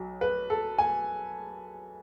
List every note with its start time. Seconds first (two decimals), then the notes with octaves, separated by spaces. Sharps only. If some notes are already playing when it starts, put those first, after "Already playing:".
Already playing: B1 F#3
0.21 B4
0.50 A4
0.78 G#5